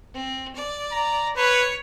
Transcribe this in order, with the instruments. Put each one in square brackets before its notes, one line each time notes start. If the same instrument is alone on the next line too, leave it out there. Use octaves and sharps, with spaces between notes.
[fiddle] C4
D5
[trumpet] A#5
[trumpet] B4 [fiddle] C#5